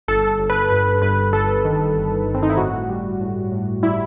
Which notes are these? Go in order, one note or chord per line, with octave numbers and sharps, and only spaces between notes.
G1 A4
A4
G1
B4
G2 B4
G2 B4
G1 A4
D#3
G1
G1
C4
D#4
E4
A2 F#4
G3
A2
A2
G3 E4